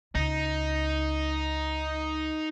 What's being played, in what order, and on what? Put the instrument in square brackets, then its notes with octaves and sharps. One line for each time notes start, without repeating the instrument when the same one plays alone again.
[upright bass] C#2 [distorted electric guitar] D#4